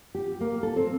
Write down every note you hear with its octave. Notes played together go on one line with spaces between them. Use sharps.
G4
A#3
A4
C4